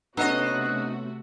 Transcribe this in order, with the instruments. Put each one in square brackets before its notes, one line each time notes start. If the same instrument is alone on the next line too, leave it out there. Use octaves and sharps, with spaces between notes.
[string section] C3 A3 F#4 [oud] B3 C#4 [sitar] D4 D#5 [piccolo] F#6